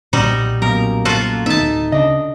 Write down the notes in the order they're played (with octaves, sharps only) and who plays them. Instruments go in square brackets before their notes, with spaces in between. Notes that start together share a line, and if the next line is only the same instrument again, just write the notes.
[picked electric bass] B1 A#2 [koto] G3 D#4 F#4
[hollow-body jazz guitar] F#2 B2 [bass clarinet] A#3 [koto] A#4
[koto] F4 F#4 A4
[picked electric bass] D#3 A3 B3 [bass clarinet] D#4 [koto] E5 A5
[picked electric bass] D1
[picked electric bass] C#3 [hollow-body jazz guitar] D4 D#5